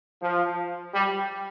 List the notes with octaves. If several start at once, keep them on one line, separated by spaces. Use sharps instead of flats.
F3
G3